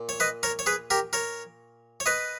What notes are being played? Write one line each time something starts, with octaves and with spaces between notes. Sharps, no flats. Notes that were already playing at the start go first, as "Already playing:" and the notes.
Already playing: A#2
C#5
B4 D#5
A#4 C#5
C#5
G#4 B4
G4 A#4
A#4 C#5
C#5
B4 D#5